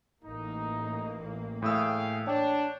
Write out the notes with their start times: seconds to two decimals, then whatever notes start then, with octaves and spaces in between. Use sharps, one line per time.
0.23 A1 A#3 D#4
1.62 A2 G#4 F5 G5 D#6 E6
2.27 D4 C#5 G5